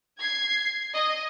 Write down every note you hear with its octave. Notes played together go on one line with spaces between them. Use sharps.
G#6 C7
D#5